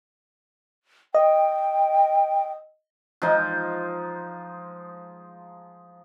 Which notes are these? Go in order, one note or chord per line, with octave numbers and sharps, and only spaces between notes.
D#5 G5
F3 G#3 D#4